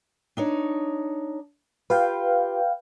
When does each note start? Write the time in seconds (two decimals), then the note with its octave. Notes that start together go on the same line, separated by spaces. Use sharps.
0.37 D4 D#4 C#5
1.90 F4 G4 B4 F5 G5